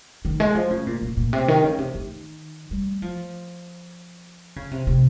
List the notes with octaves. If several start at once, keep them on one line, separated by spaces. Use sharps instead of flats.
D#3
G#3
F3
C#3
A#2
A#2
A#2
C3
D#3
C#3
C3
D#3
G3
F3
C#3
C3
C3